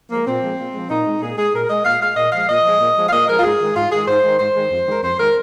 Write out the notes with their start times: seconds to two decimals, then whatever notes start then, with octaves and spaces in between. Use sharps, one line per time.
0.10 F3 G#3 A#3
0.26 A#2 C4
0.42 F3 G#3
0.58 A#2
0.73 F3 G#3
0.89 A#2 D#4
1.06 G#3
1.21 A#2 G#4
1.37 G#3 G#4
1.53 A#2 A#4
1.69 G#3 D#5
1.85 A#2 F5
2.01 G#3 F5
2.17 A#2 D#5
2.32 F3 G#3 F5
2.48 A#2 D#5
2.64 F3 G#3
2.80 A#2
2.96 F3 G#3
3.08 F5
3.12 A#2 D#5
3.27 F3 G#3 A#4
3.39 F4
3.43 G#2 G#4
3.60 D#3 G#3
3.75 G#2 F4
3.91 D#3 G#3 G#4
4.07 G#2 C5
4.23 D#3 G#3
4.39 G#2 C5
4.55 D#3 G#3
4.70 F2
4.86 D#3 G#3 A#4
5.03 F2 C5
5.18 D#3 G#3 A#4